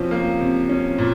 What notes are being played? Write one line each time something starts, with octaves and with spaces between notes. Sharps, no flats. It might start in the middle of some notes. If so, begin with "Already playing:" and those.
Already playing: C3 F3 C#4
A#3
C3
C#4
A#2